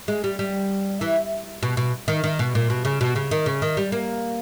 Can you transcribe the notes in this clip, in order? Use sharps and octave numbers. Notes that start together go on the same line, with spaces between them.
G#3
G3
G3
E3
B2
B2
D#3
D#3
B2
A#2
B2
C#3
B2
C#3
D#3
C#3
D#3
G3
A#3